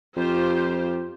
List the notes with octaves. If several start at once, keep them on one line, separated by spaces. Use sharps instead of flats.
F2 F4 G4 C5